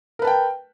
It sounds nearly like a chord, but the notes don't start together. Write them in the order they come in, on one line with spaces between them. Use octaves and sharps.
A#4 B4 A5 G5